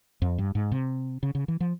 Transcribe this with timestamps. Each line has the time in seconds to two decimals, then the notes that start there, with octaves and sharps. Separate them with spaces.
0.22 F2
0.38 G2
0.55 G#2
0.72 C3
1.23 C#3
1.35 C#3
1.48 E3
1.60 F3